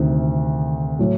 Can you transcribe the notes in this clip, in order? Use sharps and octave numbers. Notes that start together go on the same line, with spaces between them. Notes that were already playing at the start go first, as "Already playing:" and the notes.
Already playing: D2 C3 D#3
A2 F#3